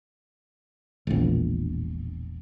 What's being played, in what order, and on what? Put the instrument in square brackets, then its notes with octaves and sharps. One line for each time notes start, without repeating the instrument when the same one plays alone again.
[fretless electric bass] E1 A#1